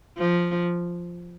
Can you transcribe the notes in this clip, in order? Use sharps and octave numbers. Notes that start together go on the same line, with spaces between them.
F3